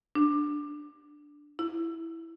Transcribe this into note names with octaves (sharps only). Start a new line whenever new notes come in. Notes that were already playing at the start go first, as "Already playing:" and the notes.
D4
E4